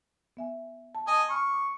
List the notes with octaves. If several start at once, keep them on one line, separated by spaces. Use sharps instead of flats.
B3 E5 G#5
A5
D#5 G#5 A5
B5 C#6 F6
D6